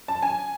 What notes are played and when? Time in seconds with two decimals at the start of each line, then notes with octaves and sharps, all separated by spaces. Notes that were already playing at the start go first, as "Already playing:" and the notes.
0.08 A5
0.22 G#5